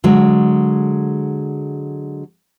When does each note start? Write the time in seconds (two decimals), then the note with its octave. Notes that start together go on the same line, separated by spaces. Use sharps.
0.04 D3 F#3 G#3